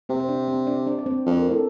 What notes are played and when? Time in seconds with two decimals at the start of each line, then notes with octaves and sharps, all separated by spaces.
0.09 C3 C4 C5
0.20 C5
0.28 D4 D5
0.48 C4 C5
0.67 D4 D5
0.87 D4 D5
0.99 D5
1.06 C4 C5
1.26 F2 C5
1.37 A#4
1.49 A2 A4